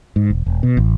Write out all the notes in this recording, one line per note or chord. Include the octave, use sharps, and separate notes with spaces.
G#2
E1
E1
B2
A1